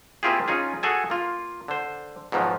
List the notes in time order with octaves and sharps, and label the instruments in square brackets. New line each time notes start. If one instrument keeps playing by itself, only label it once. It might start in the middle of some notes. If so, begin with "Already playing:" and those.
[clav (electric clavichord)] A#3 C4 E4 F4 G4 G#4
C#4 D#4 F4 G#4
F#4 G#4 A4 G#5
A#3 F4
D3 C5
G#2 B2 D#3 F3 F#3